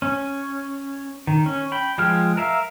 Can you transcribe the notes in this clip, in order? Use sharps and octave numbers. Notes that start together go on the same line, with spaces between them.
C#4
D#3
C#4
G5 B5
F3 G#3 G5 F6
A#4 E5 F5